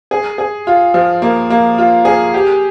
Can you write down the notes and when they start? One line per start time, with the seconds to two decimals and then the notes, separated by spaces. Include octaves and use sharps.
0.11 G#4
0.38 G#4
0.67 F4
0.94 F3
1.22 A#3
1.50 A#3
1.78 F4
2.05 G#4
2.34 G4